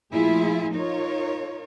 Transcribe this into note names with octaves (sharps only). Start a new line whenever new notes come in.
A#2 F3 A3 E4 F4 G#4
D#4 F4 A#4 C#5